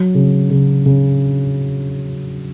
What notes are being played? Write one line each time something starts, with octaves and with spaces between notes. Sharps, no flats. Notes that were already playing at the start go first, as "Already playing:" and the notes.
Already playing: F#3
C#3
C#3
C#3